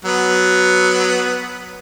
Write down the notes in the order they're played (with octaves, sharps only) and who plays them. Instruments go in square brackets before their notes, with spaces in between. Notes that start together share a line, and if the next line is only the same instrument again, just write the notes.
[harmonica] F#3 B3